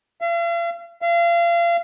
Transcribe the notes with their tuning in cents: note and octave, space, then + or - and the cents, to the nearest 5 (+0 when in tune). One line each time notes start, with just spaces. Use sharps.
F5 -45
F5 -35